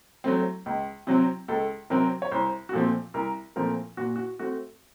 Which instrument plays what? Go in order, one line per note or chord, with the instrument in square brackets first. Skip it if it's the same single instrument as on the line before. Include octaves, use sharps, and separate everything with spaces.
[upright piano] F#3 A3 C4
C#2
C3 F#3 C4
C#2 A4
C3 F#3 C4 A#4
C#5
C2 C5
F#4
A#2 F3 A3 C4 A4
C2 A#4
A#2 F3 A3 C4 A#4
A#2 F#4
F#4
A3 C4 F#4